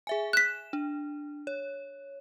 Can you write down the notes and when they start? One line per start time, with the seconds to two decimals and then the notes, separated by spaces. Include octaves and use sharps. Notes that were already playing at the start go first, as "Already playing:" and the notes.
0.07 G#4 E5 G#5
0.33 F#6 B6 E7
0.73 D4
1.47 C#5